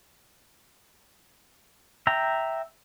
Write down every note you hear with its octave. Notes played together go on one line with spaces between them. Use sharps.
E5 G5 A#5